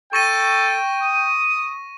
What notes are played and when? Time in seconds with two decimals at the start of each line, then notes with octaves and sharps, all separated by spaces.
0.13 A4 G5 C#6 A#6 D#7
1.02 D#6